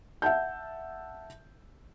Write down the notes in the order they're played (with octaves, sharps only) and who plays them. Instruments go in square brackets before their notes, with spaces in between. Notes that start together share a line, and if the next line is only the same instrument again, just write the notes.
[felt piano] E5 F#5 A5 G6